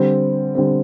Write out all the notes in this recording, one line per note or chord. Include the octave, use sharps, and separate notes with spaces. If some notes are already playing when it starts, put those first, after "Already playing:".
Already playing: D3 G3 C4
D3 G3 C4